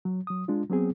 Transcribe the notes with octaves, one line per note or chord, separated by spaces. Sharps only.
F#3
F#3 D#6
G#3 D4 F4
F#3 B3 C4 G#4